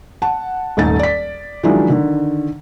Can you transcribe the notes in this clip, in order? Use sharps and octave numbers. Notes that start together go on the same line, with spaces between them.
F#5 A5
D#1 G#2 A3 D#4 G#5 A6
D5 B6
D#3 F3 F#3 G#3 D4 E4
D3 D#3